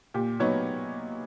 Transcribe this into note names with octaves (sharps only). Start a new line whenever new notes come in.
A#2 G4
F#3 B3 D#4 C#5